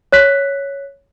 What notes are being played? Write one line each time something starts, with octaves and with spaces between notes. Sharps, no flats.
C#5 F#6 B6